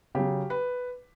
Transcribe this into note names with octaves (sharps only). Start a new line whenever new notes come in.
C#3 F#3 G4
B4